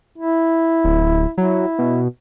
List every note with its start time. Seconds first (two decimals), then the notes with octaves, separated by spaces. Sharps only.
0.18 E4
0.84 D1
1.38 F#3 E4
1.79 B2